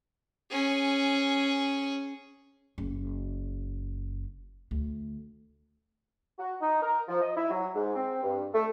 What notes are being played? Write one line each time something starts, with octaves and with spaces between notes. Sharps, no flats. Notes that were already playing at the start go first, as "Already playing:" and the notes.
C#4 G#4
F#1
D2
F#4
D#4
A#4
F3
D#5
E4
F#3
G#2
C4
G2
A3